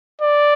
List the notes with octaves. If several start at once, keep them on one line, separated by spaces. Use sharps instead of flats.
D5